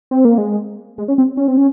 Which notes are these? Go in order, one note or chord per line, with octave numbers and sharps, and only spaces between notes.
C4
A#3
G#3
G#3
C#4
C4
C#4
C4
C#4